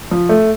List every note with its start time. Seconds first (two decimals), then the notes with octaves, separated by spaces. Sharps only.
0.11 F3
0.29 A3